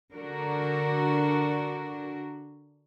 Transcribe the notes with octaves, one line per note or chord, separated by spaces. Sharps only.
D3 D4 F#4 A#4